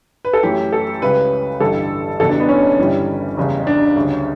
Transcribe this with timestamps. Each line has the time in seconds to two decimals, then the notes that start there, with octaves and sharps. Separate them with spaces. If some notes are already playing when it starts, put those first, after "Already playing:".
0.25 B4
0.33 A4
0.43 F#2 E3 A3 G4
0.72 A4
1.02 C#2 C#3 G3 B4
1.60 A1 G2 D3 G3 A4
2.19 F#1 E2 B2 G3 A4
2.29 D4
2.40 B3
2.49 C#4
2.78 G1 G2 E3 G3
3.37 F#1 E2 C#3 G3
3.67 D4
3.96 D2 C#3 G3